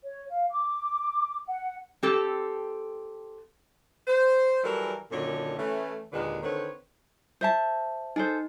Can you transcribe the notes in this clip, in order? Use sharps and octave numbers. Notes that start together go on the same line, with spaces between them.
C#5
F5
D6
F#5
C4 G4 A4
C5
E3 F#3 G3 A4 A#4
F#2 A#2 D3 D#3 A4 C#5
E3 A3 C#4
D#2 A#2 D3 G#3 D#4 B4
D3 D#3 C4 B4 C#5
C5 E5 A5
D#4 G#4 A4 C5